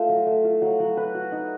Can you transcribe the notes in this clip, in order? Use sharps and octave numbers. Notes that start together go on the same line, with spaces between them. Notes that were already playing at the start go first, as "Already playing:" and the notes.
Already playing: A3 F4
F#3
A3
F4
F#3
F#3
B4
F#4
D#4